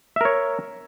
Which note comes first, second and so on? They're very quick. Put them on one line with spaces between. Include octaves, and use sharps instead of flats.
E5 A#4 C#5